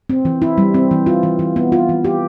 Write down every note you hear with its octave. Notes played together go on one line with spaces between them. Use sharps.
C4
E3
E4
G3
C4
E3
F4
E3
E3
B3
F4
E3
G4